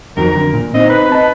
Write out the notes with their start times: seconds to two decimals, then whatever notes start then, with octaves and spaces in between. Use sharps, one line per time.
0.17 F2 D#3 F#3 A#4
0.35 D3
0.53 A#2
0.74 C4 D#4 D#5
0.90 B4
1.12 D#5 A5